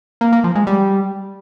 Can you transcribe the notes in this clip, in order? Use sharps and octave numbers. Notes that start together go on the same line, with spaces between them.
A#3
A#3
F3
G#3
G3